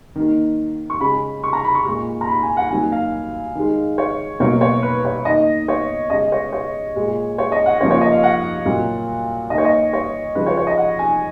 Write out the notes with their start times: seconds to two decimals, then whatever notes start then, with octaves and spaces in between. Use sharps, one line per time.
0.16 D#3 A#3
0.90 C#6
1.00 C#3 G#3 B5
1.44 C#6
1.53 A#5
1.64 B5
1.75 C#6
1.85 A#2 G#3 C#6
2.21 A#5
2.28 B5
2.43 G#5
2.57 F#5
2.70 D#3 F#3 A#3 G#5
2.92 F5
3.55 D#3 G#3
3.98 C#5
4.40 B2 F#3 A#3 C#5
4.61 C#5
4.83 B4
5.05 C#5
5.25 D#3 A#3 D#5
5.68 C#5
6.10 C#3 G#3 D#5
6.32 C#5
6.53 C#5
6.96 A#2 G#3
7.38 C#5
7.52 D#5
7.66 F#5
7.81 C#3 C#5
7.83 F3 A#3
7.91 C#5
8.01 D#5
8.12 F5
8.23 F#5
8.65 A#2 F#3 A#3
9.50 D#3 A#3 D#5
9.58 C#5
9.65 D#5
9.93 C#5
10.35 C#3 F3 G#3 B4
10.46 C#5
10.57 C#5
10.67 D#5
10.78 F#5
10.99 G#5